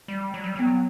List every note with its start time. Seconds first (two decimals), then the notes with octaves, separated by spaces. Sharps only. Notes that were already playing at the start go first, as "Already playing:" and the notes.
0.08 G3
0.34 F#3
0.44 G3
0.56 F#3 B3